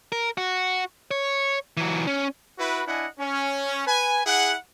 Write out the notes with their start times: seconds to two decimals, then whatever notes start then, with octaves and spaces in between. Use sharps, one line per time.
0.12 A#4
0.37 F#4
1.11 C#5
1.77 E3 F#3
2.07 C#4
2.59 E4 F#4 B4
2.88 D4 E4 D#5 F#5 G#5
3.19 C#4
3.87 B4 G#5
4.26 E4 G#4 F#5